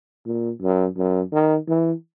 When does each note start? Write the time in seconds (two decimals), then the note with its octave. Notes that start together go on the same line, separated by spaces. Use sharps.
0.26 A#2
0.62 F#2
0.97 F#2
1.32 D#3
1.68 E3